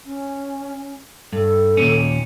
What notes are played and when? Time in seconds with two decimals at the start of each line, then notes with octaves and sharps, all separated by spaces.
0.05 C#4
1.33 G2 A4
1.77 D#2 A#2 C#4